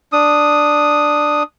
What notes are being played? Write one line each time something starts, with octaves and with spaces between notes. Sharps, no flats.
D4 D#6